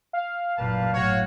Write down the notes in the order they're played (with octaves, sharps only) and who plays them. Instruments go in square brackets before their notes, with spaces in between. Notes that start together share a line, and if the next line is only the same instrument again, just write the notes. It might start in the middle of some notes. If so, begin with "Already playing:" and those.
[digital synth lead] F5
[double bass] F#1 A#2 [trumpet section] G3 B4 A5
[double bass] F#1 A2 [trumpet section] F#4 C#5